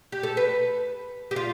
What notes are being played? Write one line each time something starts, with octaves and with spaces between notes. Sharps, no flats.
G4
A4
B4
G4
F4